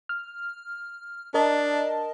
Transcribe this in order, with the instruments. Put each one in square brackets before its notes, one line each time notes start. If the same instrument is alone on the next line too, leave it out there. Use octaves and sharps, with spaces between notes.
[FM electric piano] F6
[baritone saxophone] D4 [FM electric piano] A#4 D#5 A5